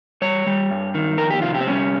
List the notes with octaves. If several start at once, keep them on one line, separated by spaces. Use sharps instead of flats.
G3 C#5
G3
G2
D#3
F2 A#4
G4
C3 F4
G4
C4
G3 C#4